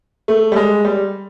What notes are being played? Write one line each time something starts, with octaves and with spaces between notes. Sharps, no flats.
A3
G3
G#3
G3